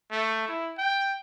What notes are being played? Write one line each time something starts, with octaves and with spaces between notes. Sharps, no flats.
A3
E4
G5